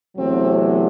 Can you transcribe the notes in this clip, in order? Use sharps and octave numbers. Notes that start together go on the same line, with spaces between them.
E2 C3 F#3 A3 C4